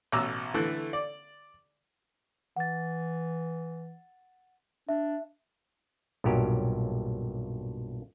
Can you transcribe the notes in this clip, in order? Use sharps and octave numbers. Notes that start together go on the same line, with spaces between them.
A1 B2 A#5 D6 E6
D3 E3 A3
D5
E3 F#5 A6
D4 E5
B1 G2 A#2 F#3 G4 A#4